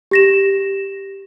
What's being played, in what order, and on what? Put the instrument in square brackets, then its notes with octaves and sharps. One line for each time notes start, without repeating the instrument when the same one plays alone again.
[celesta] G4 A#6 E7